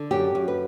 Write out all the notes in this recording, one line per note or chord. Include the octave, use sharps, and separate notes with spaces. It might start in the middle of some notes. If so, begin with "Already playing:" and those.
Already playing: D3
F#2 G4
F#2
B4